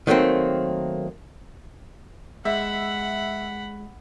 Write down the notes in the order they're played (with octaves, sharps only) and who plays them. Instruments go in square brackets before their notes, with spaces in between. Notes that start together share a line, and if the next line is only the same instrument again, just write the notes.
[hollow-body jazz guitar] D#3 F#3 A3 A#3 C4
[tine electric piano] G#3 [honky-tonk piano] E5 [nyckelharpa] F#5 B5